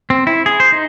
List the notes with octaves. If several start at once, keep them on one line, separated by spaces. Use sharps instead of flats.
C4
E4
G#4
C5
D#4